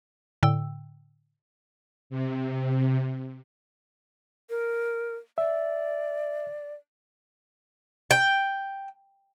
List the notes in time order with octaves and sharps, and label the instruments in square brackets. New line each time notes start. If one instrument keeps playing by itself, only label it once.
[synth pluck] A2 D3 G5 E6
[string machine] C3
[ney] A#4
[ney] D5 [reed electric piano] E5
[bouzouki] G5